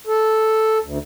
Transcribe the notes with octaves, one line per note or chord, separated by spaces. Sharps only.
A4
D2